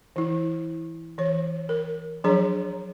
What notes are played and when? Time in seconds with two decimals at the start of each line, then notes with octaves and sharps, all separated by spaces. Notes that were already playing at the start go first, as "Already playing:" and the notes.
0.16 E3 E4
1.18 E3 C#5
1.69 A#4
2.24 F3 F#3 D4 G#4 C#5 A#5